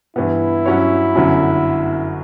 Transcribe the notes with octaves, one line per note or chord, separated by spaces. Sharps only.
G2 E3 B3 E4
G2 F#3 C#4 F#4 C#5
G1 F#2 D3 F#3 C#4